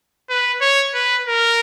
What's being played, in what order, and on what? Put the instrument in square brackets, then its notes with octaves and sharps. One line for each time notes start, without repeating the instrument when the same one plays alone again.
[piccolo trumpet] B4
C#5
B4
A#4